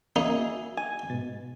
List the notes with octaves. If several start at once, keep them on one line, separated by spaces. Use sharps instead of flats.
A#3 D#4 F#4 G#4 E5
G#5
G#2 B2 A6